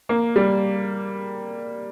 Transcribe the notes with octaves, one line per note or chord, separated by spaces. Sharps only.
A#3
G3